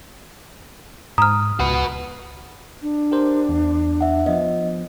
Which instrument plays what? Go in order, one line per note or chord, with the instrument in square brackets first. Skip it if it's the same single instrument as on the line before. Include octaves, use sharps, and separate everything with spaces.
[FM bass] G#2 [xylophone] A#5 F6 [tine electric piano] D#6
[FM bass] C#2 [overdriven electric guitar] F#4 B4
[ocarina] D4
[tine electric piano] G4 A#4 C5
E2
[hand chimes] E5 F#5
[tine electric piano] F3 B3 [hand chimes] D#5